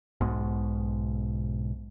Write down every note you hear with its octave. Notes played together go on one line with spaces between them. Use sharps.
B1 G#2 B2